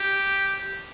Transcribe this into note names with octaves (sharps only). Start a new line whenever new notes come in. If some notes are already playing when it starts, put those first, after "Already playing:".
Already playing: G4